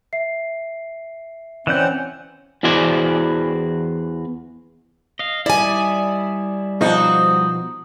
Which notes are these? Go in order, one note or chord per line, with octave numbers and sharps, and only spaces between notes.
E5 C7
E3 C4 C#4 D5 F#5 G6
E2 E3 F#4 C5 D5 G#5
D#5 F5
D#3 G3 E4 D5 G#5
B2 F3 B3 C4 D#4 F#4